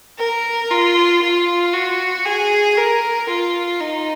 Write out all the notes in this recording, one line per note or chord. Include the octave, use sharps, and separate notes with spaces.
A#4
F4
F4
F#4
G#4
A#4
F4
D#4